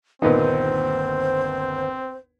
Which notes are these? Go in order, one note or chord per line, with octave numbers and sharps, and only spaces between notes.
G1 D#2 A#2 B3 C4 D#4 C5